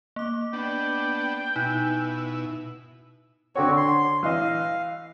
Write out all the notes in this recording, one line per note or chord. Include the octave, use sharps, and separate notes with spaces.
A#3 D6
B3 D4 G5
B2 D#4 E4
D3 C4 F#4 C#5
C6
E3 D#5 F5